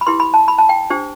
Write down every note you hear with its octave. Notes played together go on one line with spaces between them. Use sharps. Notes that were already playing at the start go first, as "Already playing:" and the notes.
B5
E4 G4 B4 C6
B5
A5
B5
A5
G5
D4 G4 C5